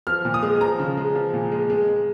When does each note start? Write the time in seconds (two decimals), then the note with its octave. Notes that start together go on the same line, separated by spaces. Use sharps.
0.07 F3 F6
0.25 A#2
0.34 D#6
0.43 G#3
0.60 F3 A#5
0.79 C#3
0.97 G#3
1.15 F3
1.34 A#2
1.52 G#3
1.70 G#3
1.88 G#3